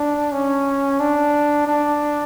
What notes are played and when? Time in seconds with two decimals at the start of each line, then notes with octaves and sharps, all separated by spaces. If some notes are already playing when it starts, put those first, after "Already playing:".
Already playing: D4
0.32 C#4
1.00 D4
1.67 D4